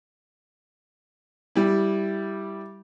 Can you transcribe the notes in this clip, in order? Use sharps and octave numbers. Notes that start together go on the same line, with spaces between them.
G3 E4